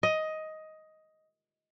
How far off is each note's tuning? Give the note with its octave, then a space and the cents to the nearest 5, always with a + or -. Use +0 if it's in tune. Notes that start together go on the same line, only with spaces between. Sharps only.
D#5 +10